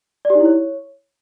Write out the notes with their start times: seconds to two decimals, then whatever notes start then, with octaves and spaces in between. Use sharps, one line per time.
0.25 D5
0.30 G4
0.35 D#4
0.40 E4
0.45 C#5